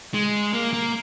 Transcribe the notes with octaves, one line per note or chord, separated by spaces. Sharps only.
G#3
A#3
A#3